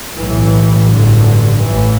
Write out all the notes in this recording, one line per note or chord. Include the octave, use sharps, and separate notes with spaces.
B1 A2 E3
A1 G2 D3
A1 A2 E3